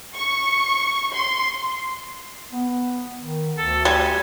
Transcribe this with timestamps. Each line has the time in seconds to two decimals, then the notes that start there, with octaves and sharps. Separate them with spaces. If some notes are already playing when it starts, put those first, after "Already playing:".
0.14 C#6
1.13 C6
2.51 B3
3.19 D#3
3.58 D2 A4
3.85 G3 G#5